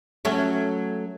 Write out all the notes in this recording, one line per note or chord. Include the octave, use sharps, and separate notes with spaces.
F#3 A3 C#4